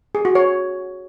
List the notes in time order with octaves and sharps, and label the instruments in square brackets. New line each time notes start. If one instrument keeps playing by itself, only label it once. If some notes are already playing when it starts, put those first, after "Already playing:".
[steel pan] G#4
F#4
C#5